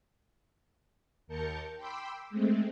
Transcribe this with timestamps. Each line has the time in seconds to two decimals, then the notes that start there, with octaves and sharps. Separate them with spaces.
1.28 D#2 A#4 A5 G6 C#7
1.77 G5 B5 C6 D6 E6
2.30 G#3 A3 C4